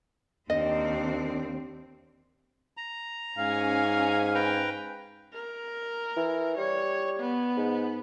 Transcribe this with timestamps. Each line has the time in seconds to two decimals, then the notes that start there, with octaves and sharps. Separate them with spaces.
0.50 D#2 C4 D4 D#5
2.77 A#5
3.38 G#2 C#4 F5 G#5
4.35 B4 G5 A#5
5.33 A#4
6.17 E3
6.58 G3 C#5
7.20 B3
7.57 G#2